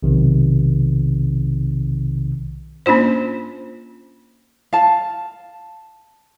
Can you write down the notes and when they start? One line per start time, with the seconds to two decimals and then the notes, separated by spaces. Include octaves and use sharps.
0.03 B1 C3 D#3
2.86 A#3 C#4 D4 F4 C5
4.73 F5 A5